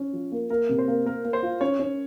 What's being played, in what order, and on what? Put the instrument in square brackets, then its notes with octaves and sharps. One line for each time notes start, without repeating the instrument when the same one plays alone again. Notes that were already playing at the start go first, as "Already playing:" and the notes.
Already playing: [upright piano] C#4
F3
A#3
[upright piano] A#3 [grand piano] A#4
[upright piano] C3
[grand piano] C5
[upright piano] A#3
[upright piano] A#3 [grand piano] A#4
[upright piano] A#3
[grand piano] C5
[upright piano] F4
[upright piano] C#4 [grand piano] C#5
[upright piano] C#4